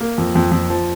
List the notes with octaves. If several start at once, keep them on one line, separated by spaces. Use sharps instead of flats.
A#3
F2
F2
F2
F3